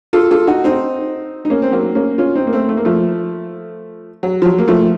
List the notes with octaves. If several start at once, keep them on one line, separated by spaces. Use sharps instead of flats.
F4 A4
F4 A4
D#4 F#4
C4 D#4
D#4
A#3 C#4
C4
F#3 A#3
A#3 C#4
C#4 F4
C4 D#4
A#3
A3 C4
A3
A#3
F3 A3
F#3
F3
F#3
A#3
F3 A3